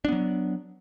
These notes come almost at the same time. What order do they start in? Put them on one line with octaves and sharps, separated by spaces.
D4 B3 F#3